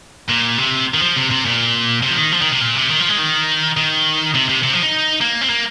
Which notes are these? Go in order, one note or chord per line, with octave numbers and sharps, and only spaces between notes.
A#2
C3
D#3
F3
C3
C3
A#2
C3
F3
D#3
F3
D#3
C3
A#2
C3
D#3
F3
G#3
D#3
D#3
C3
C3
C3
F3
D#4
A#3
C4
A#3